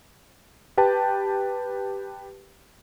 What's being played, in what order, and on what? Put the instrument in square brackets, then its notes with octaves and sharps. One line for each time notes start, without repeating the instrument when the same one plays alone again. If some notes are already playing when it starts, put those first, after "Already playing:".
[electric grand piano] G4 B4 G5 A5